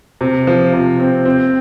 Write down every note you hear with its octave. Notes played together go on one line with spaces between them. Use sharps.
C3
F3
C3
C4
C4